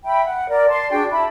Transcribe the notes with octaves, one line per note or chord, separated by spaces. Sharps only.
E5 G5 B5
F#5
A#4 D5
D5 A5 C6
D4 F#4 G#4 G5
E4 A5 B5